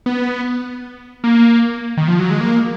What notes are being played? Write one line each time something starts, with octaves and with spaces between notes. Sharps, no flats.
B3
A#3
D#3
F3
F#3
G#3
A#3